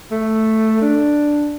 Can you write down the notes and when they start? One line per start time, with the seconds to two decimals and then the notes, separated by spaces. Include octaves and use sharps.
0.11 A3
0.81 D4